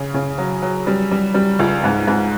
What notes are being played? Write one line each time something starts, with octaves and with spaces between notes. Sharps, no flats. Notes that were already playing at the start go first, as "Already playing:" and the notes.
Already playing: C#3
C#3
F#3
F#3
G3
G3
G3
C#2
G#2
G#2